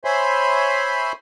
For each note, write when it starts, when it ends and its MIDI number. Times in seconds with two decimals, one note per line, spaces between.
0.05 1.12 72
0.05 1.12 73
0.05 1.12 76
0.05 1.12 80
0.05 1.12 83
0.05 1.12 84